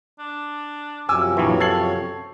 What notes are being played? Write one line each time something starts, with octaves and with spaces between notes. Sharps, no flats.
D4
F#2 C3 F3 G#5 D6 E6
A#1 E3 C#5
A4 G#6 C7 F#7